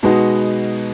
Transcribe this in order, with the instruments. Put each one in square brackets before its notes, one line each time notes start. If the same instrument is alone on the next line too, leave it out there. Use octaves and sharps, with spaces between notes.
[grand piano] B2 G#3 B3 D#4 F#4